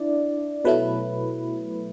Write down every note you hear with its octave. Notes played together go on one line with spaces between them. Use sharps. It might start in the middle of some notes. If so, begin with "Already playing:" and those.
Already playing: D4 E4 D5
B2 F#3 A3 E4 B4